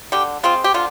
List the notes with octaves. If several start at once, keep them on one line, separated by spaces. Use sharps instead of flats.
D3 G4
G#3 C4 F4
G4
D3 F4